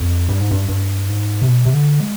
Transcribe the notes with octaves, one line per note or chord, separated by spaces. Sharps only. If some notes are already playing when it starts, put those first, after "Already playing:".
Already playing: F2
G2
G#2
G2
G2
G#2
C3
B2
C3
D3
G#3